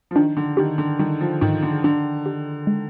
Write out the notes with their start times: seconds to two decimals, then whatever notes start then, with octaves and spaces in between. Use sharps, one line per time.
0.11 F3
0.15 D#3 D4
0.37 D3
0.57 D#3 G4
0.78 D3
0.99 D#3 G3
1.21 F3
1.41 G#2 D#3
1.63 D3
1.84 D3 D4
2.26 G4
2.67 G#3